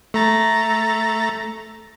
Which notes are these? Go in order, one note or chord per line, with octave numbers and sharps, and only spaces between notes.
A3 A#5 A6